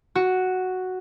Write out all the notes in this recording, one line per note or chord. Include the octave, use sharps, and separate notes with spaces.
F#4